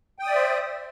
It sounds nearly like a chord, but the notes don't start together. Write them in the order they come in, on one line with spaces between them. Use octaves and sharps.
G5 D#6 D5 E5 C5